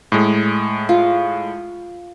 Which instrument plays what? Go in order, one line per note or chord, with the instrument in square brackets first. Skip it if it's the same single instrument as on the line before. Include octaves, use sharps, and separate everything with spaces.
[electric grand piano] A2 G#3
[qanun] F4